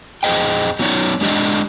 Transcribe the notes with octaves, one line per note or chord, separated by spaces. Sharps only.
F2 G#4 C5 D#5 G5
F#3 B3 D#4 C#5 D5
G#3 A3 D4 G4 D5 D#5